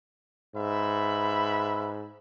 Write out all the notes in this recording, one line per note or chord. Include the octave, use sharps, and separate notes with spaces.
G#2 B4 E5 B5